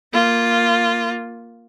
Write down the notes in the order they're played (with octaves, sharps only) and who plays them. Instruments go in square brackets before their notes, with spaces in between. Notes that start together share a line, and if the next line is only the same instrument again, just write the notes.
[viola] A#3 F4